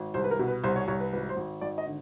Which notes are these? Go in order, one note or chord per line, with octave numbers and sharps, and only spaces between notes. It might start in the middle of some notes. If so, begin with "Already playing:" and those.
Already playing: G#1
C2 C5
B4
A#4
B2
B4
C2 C5
C#5
C2 C#5
B4
G#1 B4
C5
G#1
G#1 D5
D#5
D3